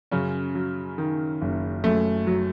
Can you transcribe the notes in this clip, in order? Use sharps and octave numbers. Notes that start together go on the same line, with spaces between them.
F#2 C#3 C#4
F#3
D#3
F#1
F#2 A3
F#3